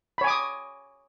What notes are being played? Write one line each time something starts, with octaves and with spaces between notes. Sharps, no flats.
C#5 G#5 B5 D6 D#6